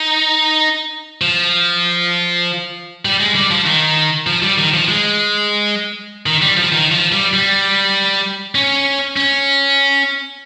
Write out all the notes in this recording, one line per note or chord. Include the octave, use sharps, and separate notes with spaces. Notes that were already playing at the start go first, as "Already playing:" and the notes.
Already playing: D#4
F3
G3
G#3
G3
F3
D#3
F3
G3
D#3
F3
G#3
D#3
G3
F3
D#3
F3
G3
G3
C#4
C#4